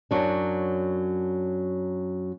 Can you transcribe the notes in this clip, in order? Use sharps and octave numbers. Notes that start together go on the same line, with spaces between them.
F#2 F#3 D4